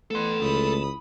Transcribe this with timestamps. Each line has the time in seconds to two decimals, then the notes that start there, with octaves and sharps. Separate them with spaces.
0.11 E3 A3 B3 A4 C6
0.41 C#2 E4 B5 D#6